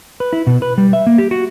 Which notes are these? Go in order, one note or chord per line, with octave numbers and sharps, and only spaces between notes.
B4
E4
B2
B4
G3
E5
A#3
G4
F#4